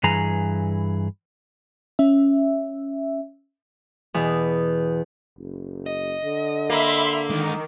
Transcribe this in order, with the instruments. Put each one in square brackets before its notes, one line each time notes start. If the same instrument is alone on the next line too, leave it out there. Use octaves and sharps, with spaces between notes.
[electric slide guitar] G2 E3 G#4 A#5
[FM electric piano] C#4 E5
[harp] E2 B2
[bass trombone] F#1
[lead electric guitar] D#5
[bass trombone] D3
[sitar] A#3 [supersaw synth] E5 B5 C6
[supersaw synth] D#3 [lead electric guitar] G#3 A#4